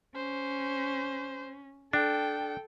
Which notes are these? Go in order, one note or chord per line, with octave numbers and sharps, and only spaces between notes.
C#4 C5
D4 A4 G5